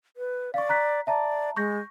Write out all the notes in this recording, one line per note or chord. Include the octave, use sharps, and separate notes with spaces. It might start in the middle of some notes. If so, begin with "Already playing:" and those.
B4
D5 F5 C#6
A#5 F#6 B6
D5 E5 A5 A#5
G#3 C#6 G6 A#6